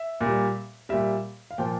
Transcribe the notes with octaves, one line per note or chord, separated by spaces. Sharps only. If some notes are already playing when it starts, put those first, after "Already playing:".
Already playing: E5
A#2
G3
A#2 G3 E5
F5
A#2 F3 G5